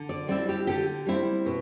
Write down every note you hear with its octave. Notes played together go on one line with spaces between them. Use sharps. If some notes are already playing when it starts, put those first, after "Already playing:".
Already playing: D3
D5
G3 C4 E4 D5
G4
D3 G4
G3 C4 E4
B2